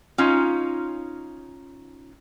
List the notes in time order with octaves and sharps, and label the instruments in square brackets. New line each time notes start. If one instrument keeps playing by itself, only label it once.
[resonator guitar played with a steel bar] C#4 D#4 F4